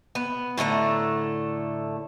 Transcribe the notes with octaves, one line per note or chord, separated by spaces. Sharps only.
B3
A2 D3 A3 A#5